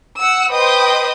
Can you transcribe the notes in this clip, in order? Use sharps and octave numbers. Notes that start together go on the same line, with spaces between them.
F#5 E6
B4 C5 D#5 G5 D#6